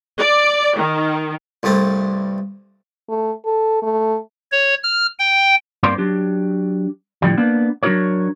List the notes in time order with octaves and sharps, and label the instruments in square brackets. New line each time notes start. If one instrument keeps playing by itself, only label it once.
[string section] D5
D#3
[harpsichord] C2 G2 A3 C4
[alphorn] A3
A4
A3
[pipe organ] C#5
F6
G5
[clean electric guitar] G2 A#3 C4 C5 D5 C6
F#3 D4 G4
A2 D3 F3 G3
A#3 B3 D4
F#3 D4 F4 F#4 A#4 C#5